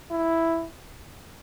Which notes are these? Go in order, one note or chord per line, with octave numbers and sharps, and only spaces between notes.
E4